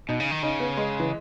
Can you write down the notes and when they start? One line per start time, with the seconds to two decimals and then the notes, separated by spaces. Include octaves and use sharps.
0.09 B2 D#4
0.20 C#3
0.31 D#3
0.43 C#3 D#4
0.60 B3
0.77 G#3
1.00 E3